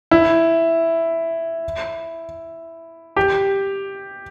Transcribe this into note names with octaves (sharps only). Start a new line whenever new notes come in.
E4
G4